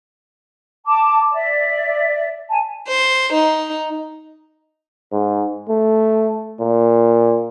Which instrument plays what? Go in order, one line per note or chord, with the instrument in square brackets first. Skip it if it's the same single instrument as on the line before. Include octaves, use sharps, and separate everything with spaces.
[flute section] A5 D6
D5 E5
G#5 A5
[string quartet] C5
D#4
[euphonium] G#2
A3
A#2